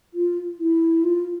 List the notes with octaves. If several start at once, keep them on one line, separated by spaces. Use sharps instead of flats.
F4
E4
F4